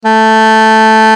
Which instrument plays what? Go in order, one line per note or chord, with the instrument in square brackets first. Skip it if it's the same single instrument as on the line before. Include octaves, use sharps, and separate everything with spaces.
[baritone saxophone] A3